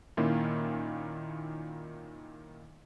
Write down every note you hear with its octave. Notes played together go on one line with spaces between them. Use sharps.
A#2 D#3 A#3 C#4 E4 F4